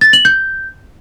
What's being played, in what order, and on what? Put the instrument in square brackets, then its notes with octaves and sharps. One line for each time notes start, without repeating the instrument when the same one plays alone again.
[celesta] A6
F#7
G6